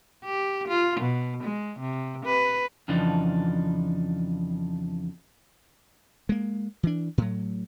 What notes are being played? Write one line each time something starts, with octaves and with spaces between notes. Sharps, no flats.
G4
F4
B2
G#3
C3
B4
F2 C#3 E3 F3 D4 D#4
G#3 A#3
E3 D4
A2 F#3